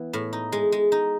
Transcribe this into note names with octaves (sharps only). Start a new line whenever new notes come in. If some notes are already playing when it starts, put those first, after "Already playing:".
Already playing: E3 B3
A2
D#4
G#3
G#3
D#4